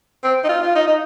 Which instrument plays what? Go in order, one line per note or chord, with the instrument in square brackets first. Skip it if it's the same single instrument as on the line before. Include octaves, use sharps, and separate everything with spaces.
[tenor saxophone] C4
D#4
F4
F4
D#4
D#4